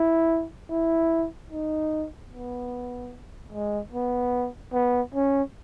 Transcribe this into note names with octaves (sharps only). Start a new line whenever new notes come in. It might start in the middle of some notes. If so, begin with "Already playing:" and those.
Already playing: E4
E4
D#4
B3
G#3
B3
B3
C#4